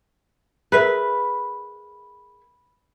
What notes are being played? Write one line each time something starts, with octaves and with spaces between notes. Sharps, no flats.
G#4 A#4 B4 E5